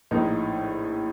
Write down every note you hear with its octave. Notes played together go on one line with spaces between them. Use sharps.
A#1 A2 D#4